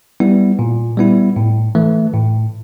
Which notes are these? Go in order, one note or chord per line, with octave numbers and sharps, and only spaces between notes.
G3 B3 E4
A#2
G3 B3 E4
A2
E3 A3
A2